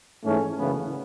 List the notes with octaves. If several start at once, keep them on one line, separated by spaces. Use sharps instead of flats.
G#2 E3 A3 C#4
F#1 E2 C#3 E3 B3